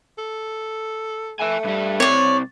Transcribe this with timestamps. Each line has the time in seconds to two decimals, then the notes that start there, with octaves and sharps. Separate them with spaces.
0.18 A4
1.39 A3 E5 G#5
1.64 G2 G3
2.00 C2 C4 C#5 D5